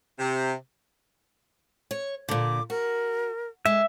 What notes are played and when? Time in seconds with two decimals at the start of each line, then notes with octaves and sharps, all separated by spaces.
0.19 C3
1.91 C#5
2.29 A#2 D3 D6
2.70 F#4 A#4
3.66 G#3 E5